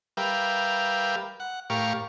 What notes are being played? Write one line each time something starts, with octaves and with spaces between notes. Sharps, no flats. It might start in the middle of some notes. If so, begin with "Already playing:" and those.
G3 A#4 B4 E5 F5 G5
F#5
A2 G4 A#4 F5 C#6